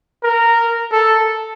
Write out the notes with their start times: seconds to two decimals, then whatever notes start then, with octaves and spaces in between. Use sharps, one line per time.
0.23 A#4
0.92 A4